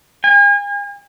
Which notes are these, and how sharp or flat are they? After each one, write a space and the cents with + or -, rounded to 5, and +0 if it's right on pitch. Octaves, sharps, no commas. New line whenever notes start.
G#5 -40